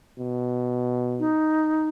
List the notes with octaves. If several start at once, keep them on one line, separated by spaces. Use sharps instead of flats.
B2
D#4